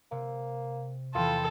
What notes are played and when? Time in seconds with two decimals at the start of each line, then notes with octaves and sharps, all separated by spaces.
0.11 C3 A#3
1.15 E2 E3 F4 A4 G5 B5 C6